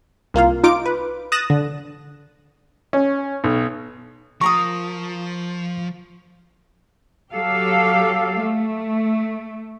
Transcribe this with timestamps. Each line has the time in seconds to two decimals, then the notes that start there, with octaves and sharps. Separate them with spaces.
0.34 C2 A#3 F4 F5
0.63 D#4 F4 D6 D7
0.86 B4
1.32 D#6 F#6 A6 A#6 E7
1.50 D3
2.93 C#4
3.44 B1
4.41 F3 A#4 A#5 C#6 D#6
7.32 F#3 G4 A4 F5
8.41 A3